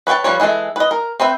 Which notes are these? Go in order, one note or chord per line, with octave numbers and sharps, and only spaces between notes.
B4 C#5 D5 G5 A5
F3 G3 B4 C#5
E3 G#3 D4 A4 E5
B4 D#5
A#4
C4 B4 E5 G5